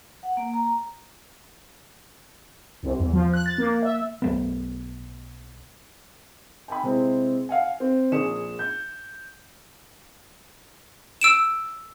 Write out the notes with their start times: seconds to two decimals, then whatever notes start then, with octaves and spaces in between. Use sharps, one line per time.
0.23 F#5
0.37 A#3
0.54 A#5
2.83 C2
2.99 E2
3.13 F3
3.34 F#6
3.46 A6
3.58 A#3
3.83 E5
4.22 B1 A3 B3
6.68 G5 G#5 B5
6.83 C3 G#3 C4 E4
7.49 F5 F#5 G#5
7.80 C4
8.12 A#1 G#4 C#7 E7
8.59 G6
11.21 E6 D7 E7